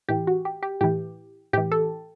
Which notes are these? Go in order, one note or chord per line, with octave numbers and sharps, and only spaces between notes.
A2 E3 G4
F#4
G4
G4
A2 E3 G4
A2 E3 G4
A4